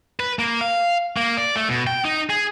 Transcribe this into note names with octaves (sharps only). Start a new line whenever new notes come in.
B4
A#3
F5
A#3
D5
A3
B2
G5
D#4
G#4